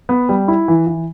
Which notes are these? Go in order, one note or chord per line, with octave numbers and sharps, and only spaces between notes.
B3
G3
E4
E3
E3